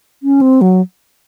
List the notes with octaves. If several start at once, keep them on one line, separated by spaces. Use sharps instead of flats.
C#4
C4
F#3